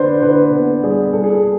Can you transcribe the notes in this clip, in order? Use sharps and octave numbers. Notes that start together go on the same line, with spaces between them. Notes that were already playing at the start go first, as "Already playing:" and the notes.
Already playing: D3 D4 B4 C5
D3 B4
B3
G3 G#4
G3 A4
G#4
A4